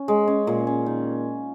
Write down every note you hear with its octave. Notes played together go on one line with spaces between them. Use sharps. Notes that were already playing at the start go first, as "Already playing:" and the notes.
Already playing: C#4
G#3
C#4
A#2
C#4
D#3